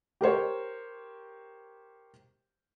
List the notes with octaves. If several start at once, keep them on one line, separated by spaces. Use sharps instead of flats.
G4 A#4 C5 C#5